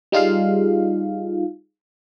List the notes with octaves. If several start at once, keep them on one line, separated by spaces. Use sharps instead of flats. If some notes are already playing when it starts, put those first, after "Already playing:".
G3 D#4 F4 G#4 F5